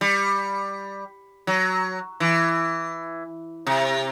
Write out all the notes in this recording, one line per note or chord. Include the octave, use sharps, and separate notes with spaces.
G3
F#3
E3
C3